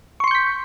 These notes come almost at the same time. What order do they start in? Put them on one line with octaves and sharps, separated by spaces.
C#6 C6 C#7 G6 B6